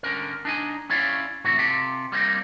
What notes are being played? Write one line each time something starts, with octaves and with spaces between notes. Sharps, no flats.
D3 C#4 A#4
D4 D#4 G#5
C#4 E4 C#5 D5 F5
A2 C3 E3 F#4
C3 F4 G4 A4
G3 A#3 C4 C#4 D#4